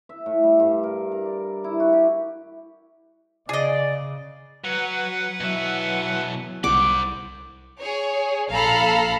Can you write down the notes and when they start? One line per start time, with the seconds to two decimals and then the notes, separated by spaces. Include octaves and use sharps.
0.09 E5
0.26 A2
0.43 G3
0.60 G2
0.83 A#4
1.12 A#4
1.25 D5
1.64 E4
1.80 F#4
1.93 G4
3.49 C#3 G#4 D5 D#5
4.64 F#3 B4 F#5
5.40 B2 E3 F#3 E5
6.64 C2 C5 F#5 D6
7.80 G#4 C#5
8.50 A#1 A4 F5 A#5 B5 F6